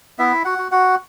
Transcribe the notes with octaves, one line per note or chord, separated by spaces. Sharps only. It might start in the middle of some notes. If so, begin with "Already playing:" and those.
B3 E4 E5
F#4 F#5
F#4
F#4 F#5